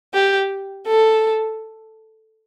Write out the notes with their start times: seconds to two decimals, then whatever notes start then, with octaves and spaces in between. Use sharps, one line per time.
0.14 G4
0.86 A4